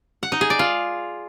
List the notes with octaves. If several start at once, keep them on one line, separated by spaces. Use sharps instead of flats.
F#5
D#4
G#4
D5
F4